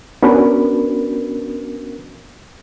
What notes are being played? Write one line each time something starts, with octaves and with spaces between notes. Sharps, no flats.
B3 C#4 D4 F#4 A#4 B4